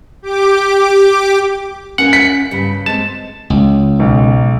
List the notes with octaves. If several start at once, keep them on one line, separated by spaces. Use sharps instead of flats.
G4 D6
C#4 A#4 F5 F#5
B6 C#7
G2 C#3 G3
G#3 C4 A5
C#2
B1